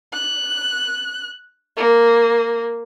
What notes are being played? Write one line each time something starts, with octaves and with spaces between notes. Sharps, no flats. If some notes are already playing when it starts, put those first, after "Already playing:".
F#6
A#3